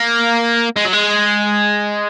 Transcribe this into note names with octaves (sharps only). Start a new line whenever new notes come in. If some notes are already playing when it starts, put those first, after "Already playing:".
Already playing: A#3
G#3
F#3
G#3